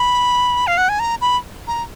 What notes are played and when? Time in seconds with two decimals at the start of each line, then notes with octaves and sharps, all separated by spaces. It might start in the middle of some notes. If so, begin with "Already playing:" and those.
Already playing: B5
0.67 F5
0.78 F#5
0.89 G#5
0.99 A#5
1.21 B5
1.68 A#5